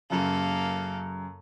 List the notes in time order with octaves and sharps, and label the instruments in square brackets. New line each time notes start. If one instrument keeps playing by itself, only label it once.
[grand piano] F#2 C#3 [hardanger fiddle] A#3 A4